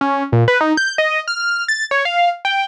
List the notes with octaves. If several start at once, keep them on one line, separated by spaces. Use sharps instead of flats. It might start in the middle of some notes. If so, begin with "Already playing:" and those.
C#4
A#2
B4
D#4
G6
D#5
F6
A6
C#5
F5
G5